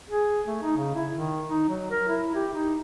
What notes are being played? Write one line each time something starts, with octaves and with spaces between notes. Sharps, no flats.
G#4
A3
D#4
C#3
E4
D#3
D#4
F#3
A#4
E4
G4
D#4